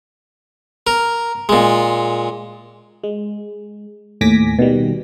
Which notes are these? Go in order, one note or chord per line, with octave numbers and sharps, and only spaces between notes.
A#4
A#2 G#3
G#3
D#2 A2 G#5 D6 A#6 B6
B2 D#3 G3